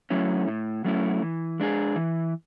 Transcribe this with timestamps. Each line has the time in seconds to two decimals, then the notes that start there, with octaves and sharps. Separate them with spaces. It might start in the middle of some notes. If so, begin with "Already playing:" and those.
0.10 F#3 A3 C#4 E4
0.48 A2
0.84 F#3 A3 C#4 E4
1.22 E3
1.60 G#3 D4 G#4
1.96 E3